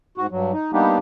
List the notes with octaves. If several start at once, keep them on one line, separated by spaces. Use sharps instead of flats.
G#2 F#4
G2 F#3
D#4
G3 A#3 B3 D4 D#4 G4